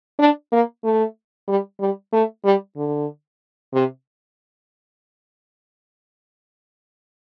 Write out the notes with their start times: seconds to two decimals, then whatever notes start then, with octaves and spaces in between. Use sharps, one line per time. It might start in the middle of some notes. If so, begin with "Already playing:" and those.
0.19 D4
0.52 A#3
0.84 A3
1.48 G3
1.80 G3
2.12 A3
2.44 G3
2.76 D3
3.73 C3